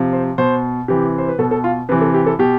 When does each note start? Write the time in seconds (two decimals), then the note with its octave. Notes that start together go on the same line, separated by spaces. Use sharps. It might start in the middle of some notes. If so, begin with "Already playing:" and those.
Already playing: C3 F3
0.13 C5
0.38 B2 C5
0.88 C3 E3 G4
1.18 C5
1.28 B4
1.39 B2 A4
1.51 A4
1.64 F4
1.89 C3 E3 B4
2.01 A4
2.14 G4
2.26 A4
2.39 B2 G4